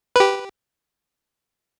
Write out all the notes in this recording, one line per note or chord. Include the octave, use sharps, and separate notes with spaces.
G4 B4